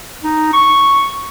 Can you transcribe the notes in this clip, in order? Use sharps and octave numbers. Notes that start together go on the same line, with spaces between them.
D#4
C#6